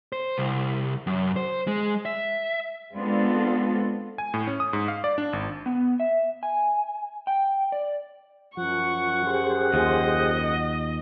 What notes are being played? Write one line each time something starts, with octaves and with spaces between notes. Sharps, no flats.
C5
C2
F#2
C5
G#3
E5
G#3 B3 C4 D4 F4 A4
G#5
A2
C#4
D#6
G#2
F5
D5
D4
G#1
B3
E5
G#5
G5
D5
F#2 F3 F#5 C#6
G4 G#4 C5
D#2 F3 D#5